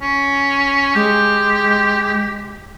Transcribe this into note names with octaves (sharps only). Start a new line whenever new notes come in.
C#4
G#3 G4